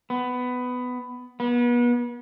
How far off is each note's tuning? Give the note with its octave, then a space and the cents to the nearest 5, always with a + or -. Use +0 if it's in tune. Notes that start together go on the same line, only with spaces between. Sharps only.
B3 +15
B3 -35